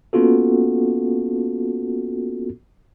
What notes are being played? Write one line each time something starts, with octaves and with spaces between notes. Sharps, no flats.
A#3 B3 C#4 F4 F#4 A4